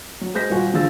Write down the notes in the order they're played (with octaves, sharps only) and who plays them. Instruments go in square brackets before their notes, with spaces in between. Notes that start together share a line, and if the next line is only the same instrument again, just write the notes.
[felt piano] F#3
G#3 C5 G6 A#6 B6
D#1 F4 F#4 G#5
D3 F3 G#4 F5 E6 A6